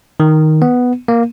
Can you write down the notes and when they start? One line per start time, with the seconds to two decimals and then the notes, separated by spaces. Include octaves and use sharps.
0.20 D#3
0.62 B3
1.08 A#3